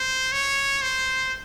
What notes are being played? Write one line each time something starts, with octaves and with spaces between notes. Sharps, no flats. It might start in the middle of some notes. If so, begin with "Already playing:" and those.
Already playing: C5
C#5
C5